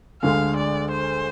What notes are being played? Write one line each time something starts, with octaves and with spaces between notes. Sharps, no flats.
D2 D3 G#3 F5
D5
C5